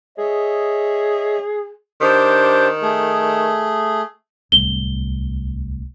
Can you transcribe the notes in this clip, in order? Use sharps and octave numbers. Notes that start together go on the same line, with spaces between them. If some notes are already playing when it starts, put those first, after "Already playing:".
G#4 C#5 D#5 E5
D#3 D4 G4 C5
A3 G#4
D1 C2 G7